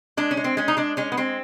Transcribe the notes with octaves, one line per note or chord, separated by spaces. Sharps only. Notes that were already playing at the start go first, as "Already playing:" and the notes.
G#3 D4
C#4
G#3
C4
G#3 C#4
D#4
G#3 D4
G#3 C#4
B3
G#3 C4